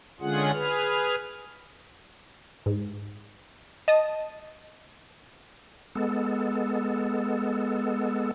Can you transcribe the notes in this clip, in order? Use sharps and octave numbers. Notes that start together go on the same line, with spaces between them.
D3 G#3 C#4 F4 G#4 F#5
G#4 B4 F6
G#2
D#5 A5 D#6
G#3 B3 A4